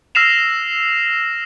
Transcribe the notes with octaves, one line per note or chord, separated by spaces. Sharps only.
E6 F6 A#6 C7 E7 F7